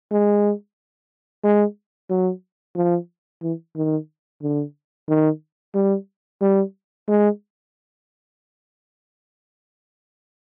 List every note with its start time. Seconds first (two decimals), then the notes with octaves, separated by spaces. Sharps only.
0.12 G#3
1.44 G#3
2.10 F#3
2.76 F3
3.42 E3
3.76 D#3
4.42 D3
5.09 D#3
5.75 G3
6.41 G3
7.08 G#3